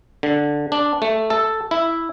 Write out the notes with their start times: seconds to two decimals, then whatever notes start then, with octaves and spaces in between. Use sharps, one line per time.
0.23 D3
0.72 D4
1.02 A3
1.30 A4
1.71 E4